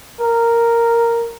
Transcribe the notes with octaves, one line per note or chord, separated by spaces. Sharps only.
A#4